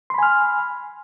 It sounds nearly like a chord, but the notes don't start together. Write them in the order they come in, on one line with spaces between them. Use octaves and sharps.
C6 B5 G#5 F6